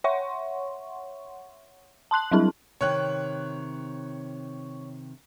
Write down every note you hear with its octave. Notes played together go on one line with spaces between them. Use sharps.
C#5 E5 F#5 C6 C#6
A5 C6 F#6 F#7
F#3 G3 C4 D4 E4 G#4
C3 D#3 C#5 F#6